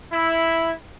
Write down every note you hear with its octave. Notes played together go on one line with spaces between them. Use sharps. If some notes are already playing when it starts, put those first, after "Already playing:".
E4